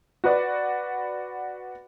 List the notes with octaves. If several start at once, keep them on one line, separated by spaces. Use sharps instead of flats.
F#4 B4 D5